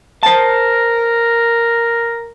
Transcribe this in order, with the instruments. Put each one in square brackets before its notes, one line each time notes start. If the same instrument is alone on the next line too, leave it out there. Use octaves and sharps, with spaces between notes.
[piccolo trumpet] A#4 [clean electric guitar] C5 A5